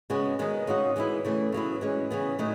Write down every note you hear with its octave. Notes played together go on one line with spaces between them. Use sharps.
C#3 G#3 B3 F#4
D#3 G#3 B3 D#4
C#3 G#3 D#4 F#4
E3 G#3 B3 E4
C#3 E3 A3
C#3 F#3 B3 E4
E3 G#3 C#4
C#3 E3 B3
A2 F#3 A3 D#4 F#4